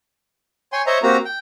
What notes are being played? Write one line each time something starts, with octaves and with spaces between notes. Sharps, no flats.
C#5 G5 G#5 C6
C5 C#5 D#5 E5 A#5
A#3 C4 F#4 G4 A#5
G5